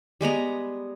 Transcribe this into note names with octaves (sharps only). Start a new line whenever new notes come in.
G3 G#3 B3 A#5